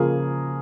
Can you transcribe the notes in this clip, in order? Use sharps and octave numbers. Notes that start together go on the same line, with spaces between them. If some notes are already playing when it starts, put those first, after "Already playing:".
Already playing: C#3 F3 A#3 G#4 A#4